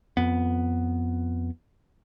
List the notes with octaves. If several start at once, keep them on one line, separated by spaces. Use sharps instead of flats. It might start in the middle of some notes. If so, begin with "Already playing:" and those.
F2 B3